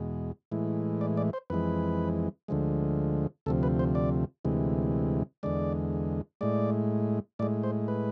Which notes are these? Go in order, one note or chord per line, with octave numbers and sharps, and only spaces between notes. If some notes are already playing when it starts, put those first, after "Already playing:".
Already playing: E2 B2 G#3
A2 E3 G#3
D5
D5
C5
F2 E3 G#3 B4
D2 D3 F3 G#3
D2 C3 F3 A4
B4
C5
D5
D2 C3 E3 G#3
E2 D3 G#3 D5
A2 G#3 D5
A2 G#3 D5
C5
B4